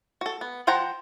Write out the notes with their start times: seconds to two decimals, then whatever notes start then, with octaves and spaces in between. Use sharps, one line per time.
0.21 F#4 A4
0.41 B3
0.67 F3 C5 F#5 G5 A#5